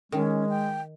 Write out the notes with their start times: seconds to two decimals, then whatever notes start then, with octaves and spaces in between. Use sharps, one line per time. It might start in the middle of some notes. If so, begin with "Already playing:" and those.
0.12 D#3 G#3 C#4
0.49 G5